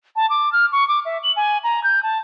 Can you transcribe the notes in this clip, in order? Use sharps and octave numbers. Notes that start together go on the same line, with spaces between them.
A5
D6
F6
C#6
D6
E5
F#7
G#5
A#5
G6
A5